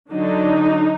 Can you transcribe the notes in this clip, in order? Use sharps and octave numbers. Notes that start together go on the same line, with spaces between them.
D3 F#3 D4 D#4